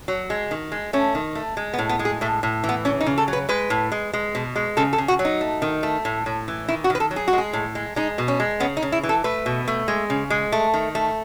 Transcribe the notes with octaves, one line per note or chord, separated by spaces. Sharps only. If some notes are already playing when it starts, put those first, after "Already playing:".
F#3
G#3
D#3
G#3
A3 C#4
D#3
A3
G#3
B3
A2
B3
G#3
G#4
A2 A3
A2
E3
B3
C#3 C#4
D#4
C#3
A4
F#3
B4
G#3 B4
A2
G#3
G#3
B2
G#3
C#3 A4
A4
C#3
F#4
F#3
D#4
A3
D#3
A3
A2
A2
E3
D#3 E4
F#4
D#3 B4
A4
F#3
G#4
F#4
G#3
G#4
A2
G#3
G#3 D#4
B2
C#4
G#3
C#3 B3
D#4
C#3
E4
E3
A4
A3 B4
B2
A3
G#3
C#3
G#3
A3
D#3
A3